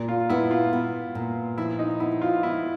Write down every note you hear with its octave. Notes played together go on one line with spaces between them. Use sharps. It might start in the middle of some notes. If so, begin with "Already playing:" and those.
Already playing: A#2
F4
B3 E4
F4
B3
A#2
F3 E4
D#4
B3 E4
F4
B3 E4